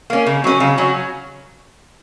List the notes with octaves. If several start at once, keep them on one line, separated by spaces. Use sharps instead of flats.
A#3 C#4
C#3
F#3 C#4
C#3
F#3 C#4